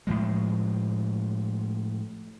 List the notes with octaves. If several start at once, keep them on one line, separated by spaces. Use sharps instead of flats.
A2 F3 G#3